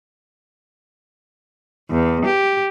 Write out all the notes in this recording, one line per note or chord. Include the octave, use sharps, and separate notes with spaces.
E2
G4